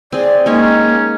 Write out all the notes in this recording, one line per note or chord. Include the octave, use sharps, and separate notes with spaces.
C4 G#4 D5
G#3 A#3 C#4 D#4 C#5